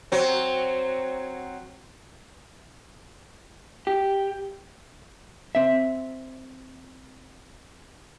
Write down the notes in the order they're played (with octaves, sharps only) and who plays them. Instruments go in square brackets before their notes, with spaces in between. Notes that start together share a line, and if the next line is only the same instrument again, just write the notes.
[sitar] F#3 C4
[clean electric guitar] G4
[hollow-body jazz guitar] C4 E5